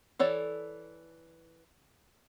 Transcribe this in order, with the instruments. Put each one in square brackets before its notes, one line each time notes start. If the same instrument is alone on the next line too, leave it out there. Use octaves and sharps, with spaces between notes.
[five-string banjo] E3 A4 C#5 D5